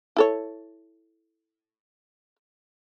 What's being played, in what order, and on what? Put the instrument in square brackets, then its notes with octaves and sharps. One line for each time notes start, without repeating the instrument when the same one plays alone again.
[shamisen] E4 A4 C#5